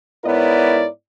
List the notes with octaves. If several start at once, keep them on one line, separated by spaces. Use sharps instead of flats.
G#2 B3 E4 A#4 C#5 D5